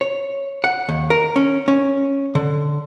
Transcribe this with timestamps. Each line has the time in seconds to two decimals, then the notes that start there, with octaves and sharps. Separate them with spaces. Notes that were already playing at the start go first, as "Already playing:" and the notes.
0.01 C#5
0.64 F#5
0.89 D#2
1.10 A#4
1.36 C#4
1.68 C#4
2.35 D3